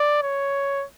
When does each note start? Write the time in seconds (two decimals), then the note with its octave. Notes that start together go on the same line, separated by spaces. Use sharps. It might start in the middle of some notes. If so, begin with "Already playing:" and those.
Already playing: D5
0.23 C#5